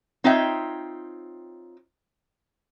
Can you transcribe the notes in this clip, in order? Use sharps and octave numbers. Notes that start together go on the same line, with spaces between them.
C4 D#4 F4 C#5 E5 G5